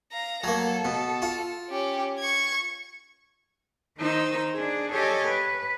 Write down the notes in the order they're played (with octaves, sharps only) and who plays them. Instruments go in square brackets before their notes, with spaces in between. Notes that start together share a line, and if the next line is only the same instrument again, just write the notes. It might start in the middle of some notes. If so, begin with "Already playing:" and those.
[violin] F5 A#5
[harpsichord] F#3 A#3 [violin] A4
[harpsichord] B2
F4
[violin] C#4 G4
C#6 G#6
[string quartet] D#3 D#4 C5 E6
D4 G#4
G4 A4 C#5 D#5 G#5
B4